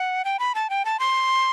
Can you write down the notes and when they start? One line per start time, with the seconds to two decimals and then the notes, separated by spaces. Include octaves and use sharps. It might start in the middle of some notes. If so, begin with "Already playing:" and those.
Already playing: F#5
0.25 G5
0.39 B5
0.55 A5
0.70 G5
0.85 A5
1.00 C6